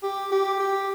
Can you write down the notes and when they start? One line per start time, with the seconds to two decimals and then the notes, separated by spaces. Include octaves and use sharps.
0.03 G4
0.32 G4
0.60 G4